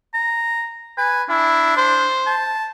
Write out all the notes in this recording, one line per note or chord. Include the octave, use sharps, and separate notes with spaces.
A#5
B4 G#5
D4 E4
C5
A5